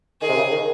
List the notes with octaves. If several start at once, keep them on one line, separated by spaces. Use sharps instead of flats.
D#3 G#4
C3
C#3
D#3